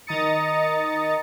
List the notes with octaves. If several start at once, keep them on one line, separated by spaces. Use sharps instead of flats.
D#3 D#5 A#5 D#6 A6 C#7